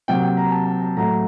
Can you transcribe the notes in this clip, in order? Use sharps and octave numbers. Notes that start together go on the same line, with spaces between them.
C3 F#3 A#3 G5
G5
A#5
A5
A5
A5
A2 F#3 A3 A#5